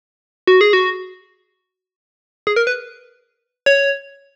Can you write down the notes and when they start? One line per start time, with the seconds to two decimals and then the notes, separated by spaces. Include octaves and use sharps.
0.47 F#4
0.61 G#4
0.73 F#4
2.47 G#4
2.56 A#4
2.67 B4
3.66 C#5